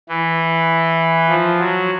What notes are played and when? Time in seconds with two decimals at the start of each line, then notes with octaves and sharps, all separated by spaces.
0.09 E3
1.29 F3
1.59 F#3